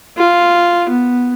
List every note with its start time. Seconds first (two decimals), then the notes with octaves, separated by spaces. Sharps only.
0.17 F4
0.89 B3